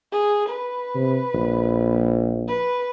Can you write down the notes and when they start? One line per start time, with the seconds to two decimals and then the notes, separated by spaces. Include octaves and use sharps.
0.12 G#4
0.50 B4
0.95 C3
1.34 A#1
2.48 B4